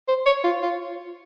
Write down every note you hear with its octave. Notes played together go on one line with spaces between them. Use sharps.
C5
C#5
F4
F4